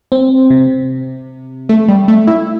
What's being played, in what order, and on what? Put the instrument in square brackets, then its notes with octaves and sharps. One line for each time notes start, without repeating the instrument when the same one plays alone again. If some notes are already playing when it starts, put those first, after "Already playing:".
[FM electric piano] C4
C3
[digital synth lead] A3
G3
A3
E4